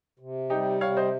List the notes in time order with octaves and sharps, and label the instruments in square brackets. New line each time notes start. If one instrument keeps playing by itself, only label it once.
[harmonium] C3
[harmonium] G3 [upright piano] D#4 G4
[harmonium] C3 [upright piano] C#5 F5
[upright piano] C5 D#5